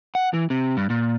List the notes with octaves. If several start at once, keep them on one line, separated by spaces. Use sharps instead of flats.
F#5
E3
C3
G2
A#2